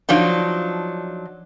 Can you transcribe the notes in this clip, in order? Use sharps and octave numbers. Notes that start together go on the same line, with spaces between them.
F3 F#3 D4 D#4